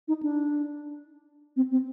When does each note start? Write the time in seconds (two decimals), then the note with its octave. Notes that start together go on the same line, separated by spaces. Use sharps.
0.08 D#4
0.23 D4
1.56 C4
1.71 C4